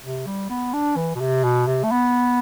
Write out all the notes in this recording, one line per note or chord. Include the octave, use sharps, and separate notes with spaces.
C3
G3
B3
D4
E3
B2
C3
B2
C3
A3
B3